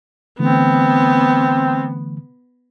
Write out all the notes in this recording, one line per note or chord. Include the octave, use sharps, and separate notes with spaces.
D3 E3 A3 B3 C4